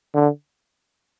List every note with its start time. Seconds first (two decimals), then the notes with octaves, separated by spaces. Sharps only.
0.14 D3